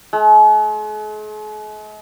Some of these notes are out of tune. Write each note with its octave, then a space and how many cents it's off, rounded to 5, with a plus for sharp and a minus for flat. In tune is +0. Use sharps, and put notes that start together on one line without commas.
G#3 +45